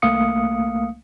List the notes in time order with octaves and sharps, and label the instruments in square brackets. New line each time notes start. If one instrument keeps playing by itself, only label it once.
[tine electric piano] C2 A3 A#3 F5 D#6 C#7